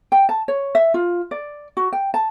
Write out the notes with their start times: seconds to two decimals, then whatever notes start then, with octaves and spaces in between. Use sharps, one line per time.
0.12 G5
0.29 A5
0.48 C#5
0.75 E5
0.94 F4
1.31 D5
1.77 F#4
1.93 G5
2.14 A5